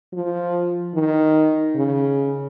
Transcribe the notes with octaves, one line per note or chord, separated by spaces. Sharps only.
F3
D#3
C#3